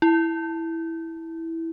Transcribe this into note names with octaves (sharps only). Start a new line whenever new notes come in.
E4